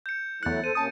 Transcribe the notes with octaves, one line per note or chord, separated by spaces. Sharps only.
G6 C#7
E2 F#3 A3 E4 F#6 A6 C#7
A4 C5 D#7
C3 A#3 C#4 A5 D#6